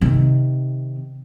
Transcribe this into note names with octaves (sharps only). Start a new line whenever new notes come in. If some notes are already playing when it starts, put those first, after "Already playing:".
C3 D#3